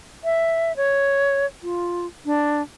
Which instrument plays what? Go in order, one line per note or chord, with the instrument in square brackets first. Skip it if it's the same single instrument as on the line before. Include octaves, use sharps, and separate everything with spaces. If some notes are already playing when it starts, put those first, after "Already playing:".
[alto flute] E5
C#5
F4
D4